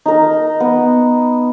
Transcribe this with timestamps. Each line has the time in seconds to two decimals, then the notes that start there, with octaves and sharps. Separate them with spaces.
0.06 D#4 A#4
0.60 B3